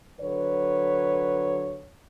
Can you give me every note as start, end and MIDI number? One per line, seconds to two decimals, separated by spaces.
0.20 1.86 50
0.20 1.86 54
0.20 1.86 71
0.20 1.86 73